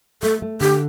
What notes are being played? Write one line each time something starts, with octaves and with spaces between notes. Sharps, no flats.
A3 A4
A3
D3 G4